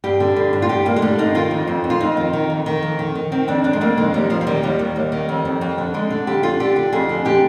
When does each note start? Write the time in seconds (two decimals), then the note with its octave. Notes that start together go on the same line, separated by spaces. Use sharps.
0.04 G2 G4
0.20 D3
0.36 G2
0.53 G2
0.62 F4
0.69 G2 G4
0.85 G2 A#3
0.96 G#3
1.02 D3 G3
1.18 G2 D#4
1.35 D#3 F4
1.51 F2
1.67 F2
1.84 F2
1.90 F4
2.01 F2 D#4
2.17 D#3
2.33 D#3
2.50 F2
2.66 D#3
2.82 F2
2.99 D#3
3.15 D#3
3.32 D#3 C4
3.48 F2 D4
3.64 F2 D4
3.73 G#3
3.81 F2 A#3
3.97 D#3 G#3
4.14 D#2 G3
4.30 D#2 F3
4.41 F3
4.47 D#3 G3
4.63 D#2 G3
4.79 D#2
4.96 D#2
5.12 D#3
5.29 F2
5.45 F2
5.61 F2
5.78 D3
5.94 D3 G#3
6.10 D3
6.27 F2 G4
6.43 D3 F4
6.60 D3 G4
6.76 D3
6.92 F2 G#4
7.09 D3
7.25 D3 G4